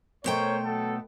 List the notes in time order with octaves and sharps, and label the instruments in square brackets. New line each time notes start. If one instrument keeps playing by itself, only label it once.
[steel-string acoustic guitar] B2 A3 G5 [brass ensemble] A#4 C5 C#5
[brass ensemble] F#3 B3 A4